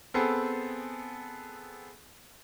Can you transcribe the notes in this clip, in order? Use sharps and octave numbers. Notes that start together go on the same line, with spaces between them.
B3 C4 G#4 A4